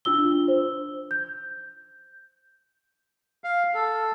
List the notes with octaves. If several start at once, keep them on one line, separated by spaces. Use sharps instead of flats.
D4 F4 E6 G7
C5
G6
F5
A4